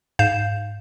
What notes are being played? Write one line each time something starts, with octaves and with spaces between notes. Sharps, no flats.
G#2 F5 G6 E7